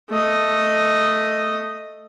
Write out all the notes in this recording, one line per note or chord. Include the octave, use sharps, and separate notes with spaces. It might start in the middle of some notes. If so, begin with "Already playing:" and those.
A3 D#5